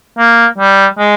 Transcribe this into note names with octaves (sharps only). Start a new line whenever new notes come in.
A#3
G3
G#3